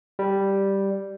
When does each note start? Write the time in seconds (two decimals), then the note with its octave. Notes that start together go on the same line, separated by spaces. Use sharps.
0.19 G3